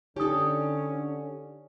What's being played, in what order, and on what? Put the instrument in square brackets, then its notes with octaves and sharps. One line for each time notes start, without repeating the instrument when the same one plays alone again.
[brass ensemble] D3 [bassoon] C#4 [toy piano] D#4 D#6 [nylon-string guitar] G4 A4